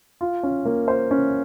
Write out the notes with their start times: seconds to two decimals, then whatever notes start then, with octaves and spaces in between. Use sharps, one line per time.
0.21 F4
0.43 C#4
0.65 A#3
0.88 C5
1.11 C#4